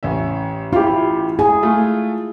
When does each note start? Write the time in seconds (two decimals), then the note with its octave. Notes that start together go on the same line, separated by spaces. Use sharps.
0.03 A1 C#4 E5
0.73 E4 F4 G4
1.39 G#4 G#5
1.63 A3 F4